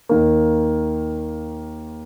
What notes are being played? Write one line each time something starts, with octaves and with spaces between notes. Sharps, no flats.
D#2 D#3 A#3